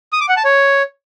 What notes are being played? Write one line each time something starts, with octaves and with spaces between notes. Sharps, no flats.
D#6
D6
F#5
A5
C#5